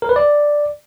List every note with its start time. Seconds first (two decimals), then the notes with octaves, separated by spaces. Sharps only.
0.02 A#4
0.09 B4
0.16 D5